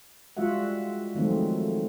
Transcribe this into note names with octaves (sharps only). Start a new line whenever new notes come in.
G3 G#3 F4 F#4 E5 F#5
D#3 F3 F#3 G#3 A3 C4